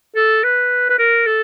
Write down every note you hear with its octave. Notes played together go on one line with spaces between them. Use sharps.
A4
B4
B4
A#4
A4